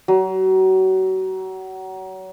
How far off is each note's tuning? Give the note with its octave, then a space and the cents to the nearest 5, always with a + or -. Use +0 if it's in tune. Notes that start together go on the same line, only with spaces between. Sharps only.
F#3 +30